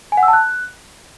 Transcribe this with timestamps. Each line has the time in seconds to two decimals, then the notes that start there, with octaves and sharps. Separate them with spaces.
0.12 G#5
0.17 F#5
0.23 E6
0.28 A5
0.33 F#6